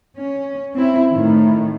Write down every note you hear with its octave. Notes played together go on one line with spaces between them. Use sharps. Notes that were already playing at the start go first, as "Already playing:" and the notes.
C#4
C4 E4
A2 D#3